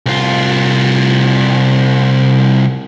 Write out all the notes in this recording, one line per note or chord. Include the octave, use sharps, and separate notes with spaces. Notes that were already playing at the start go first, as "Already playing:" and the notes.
C2 F4